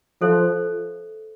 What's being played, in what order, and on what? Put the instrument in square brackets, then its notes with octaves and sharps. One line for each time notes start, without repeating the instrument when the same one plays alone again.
[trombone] F3 [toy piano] A4 C5 E5